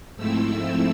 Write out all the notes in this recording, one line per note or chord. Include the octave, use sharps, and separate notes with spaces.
G#2 F3 A3 C4 E4 E6